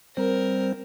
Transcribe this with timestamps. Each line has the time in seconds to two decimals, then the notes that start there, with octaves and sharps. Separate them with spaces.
0.17 G3 C4 A#4 C5